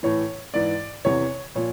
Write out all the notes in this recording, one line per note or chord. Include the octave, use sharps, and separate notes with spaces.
A2 E3 C#5
G#2 E3 D5
E2 C3 E3 C#5
A#2 F3 C#5